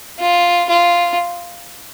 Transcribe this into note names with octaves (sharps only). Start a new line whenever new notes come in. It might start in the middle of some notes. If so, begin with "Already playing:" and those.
F4
F4